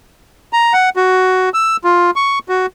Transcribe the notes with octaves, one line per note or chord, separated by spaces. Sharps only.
A#5
F#5
F#4
E6
F4
C#6
F#4